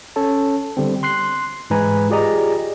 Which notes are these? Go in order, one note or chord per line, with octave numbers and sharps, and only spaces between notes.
C#4 A4 C#5 A5
D3 G3 B3 C4
C6 F#6 C7
G#2 E3 G#3 B4 G#5 A#5
F4 G4 G#4 D5 D#5 A#5